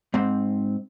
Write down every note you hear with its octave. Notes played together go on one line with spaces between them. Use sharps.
G#2 C4